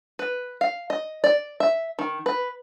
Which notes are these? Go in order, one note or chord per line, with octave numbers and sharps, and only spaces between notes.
B4
F5
D#5
D5
E5
D#3
B4